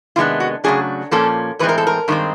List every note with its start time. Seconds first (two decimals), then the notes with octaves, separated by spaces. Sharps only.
0.16 C3 D#3 G#3 B3 D4 F4
0.40 F#4
0.64 C#3 F#3 A3 D4 G#4
1.11 A#2 F3 A#3 C#4 A4
1.59 A2 E3 G#3 C4 B4
1.69 A#4
1.78 A4
1.87 A#4
2.08 G2 D#3 G#3 C4